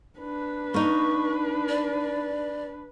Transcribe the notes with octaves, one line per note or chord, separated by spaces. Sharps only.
D4 B4
A#3 D#4 C#6
D5